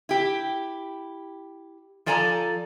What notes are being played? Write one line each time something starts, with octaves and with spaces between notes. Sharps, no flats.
E4 G4
F3 A4 D5 G#5 A#5